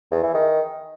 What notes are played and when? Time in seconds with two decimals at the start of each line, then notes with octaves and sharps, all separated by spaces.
0.12 E2
0.23 E3
0.34 D#3